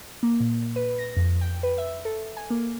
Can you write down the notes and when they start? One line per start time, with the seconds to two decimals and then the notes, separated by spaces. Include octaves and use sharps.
0.23 A#3
0.40 A#2
0.76 B4
0.98 A#6
1.17 F2
1.41 G5
1.63 B4
1.78 E5
2.05 A4
2.37 G#5
2.50 A#3